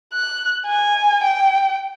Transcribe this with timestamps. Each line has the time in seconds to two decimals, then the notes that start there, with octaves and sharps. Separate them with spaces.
0.14 F#6
0.67 G#5
1.24 G5